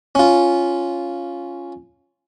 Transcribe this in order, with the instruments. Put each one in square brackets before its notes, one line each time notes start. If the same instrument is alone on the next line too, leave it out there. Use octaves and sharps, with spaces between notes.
[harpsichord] C#4 F4